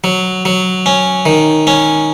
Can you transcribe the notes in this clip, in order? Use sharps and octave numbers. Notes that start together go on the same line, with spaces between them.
F#3
F#3
C#4
D#3
C#4